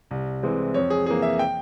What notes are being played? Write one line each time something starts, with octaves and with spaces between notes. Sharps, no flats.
C2
C3 E3 G#3 C4
F2 C#5
G#4
E3 A#3 G#4
E5
G5